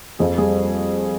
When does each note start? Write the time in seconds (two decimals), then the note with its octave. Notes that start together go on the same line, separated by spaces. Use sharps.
0.19 F2 G#4
0.38 G3 G#4